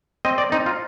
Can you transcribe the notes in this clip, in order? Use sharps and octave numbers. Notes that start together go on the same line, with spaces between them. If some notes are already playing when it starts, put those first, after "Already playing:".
C4 D#5
D5
C4 D#4
F4